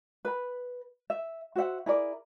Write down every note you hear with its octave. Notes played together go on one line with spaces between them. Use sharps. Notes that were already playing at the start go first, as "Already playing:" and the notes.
B4 B5
E5
F#4 C5 E5 F#5
E4 G#4 A#4 D5